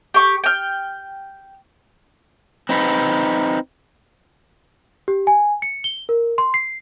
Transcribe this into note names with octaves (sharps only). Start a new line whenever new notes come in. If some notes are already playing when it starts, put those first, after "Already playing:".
G4 C#6
G5 F6
C4 D#4 B4
G4
G#5
C#7
G7
A#4
C6
C7